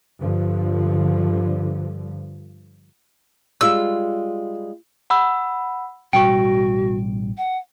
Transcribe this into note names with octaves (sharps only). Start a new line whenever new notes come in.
G2 D3 F3
G3 G#3 F4 E6
F#5 B5 E6
A1 B2 G3 F#4 G5 C#6 D7
F#5